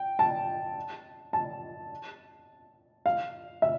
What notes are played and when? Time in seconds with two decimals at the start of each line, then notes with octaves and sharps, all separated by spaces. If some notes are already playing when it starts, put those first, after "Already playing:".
Already playing: G5
0.19 A5
1.33 A5
3.06 F5
3.62 E5